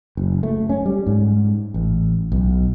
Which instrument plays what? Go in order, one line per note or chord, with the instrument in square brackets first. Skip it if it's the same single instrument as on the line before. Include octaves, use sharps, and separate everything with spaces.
[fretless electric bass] F#1
A3
C#4
G3
G#2
A1
B1